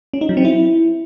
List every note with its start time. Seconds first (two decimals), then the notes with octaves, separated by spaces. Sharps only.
0.13 C#4
0.21 D#4
0.29 F#3
0.37 C4
0.45 E4